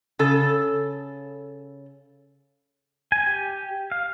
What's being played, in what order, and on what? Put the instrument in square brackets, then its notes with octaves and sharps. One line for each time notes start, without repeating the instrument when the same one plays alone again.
[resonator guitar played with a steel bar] C#3 A4
[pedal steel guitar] G#5
G4
F5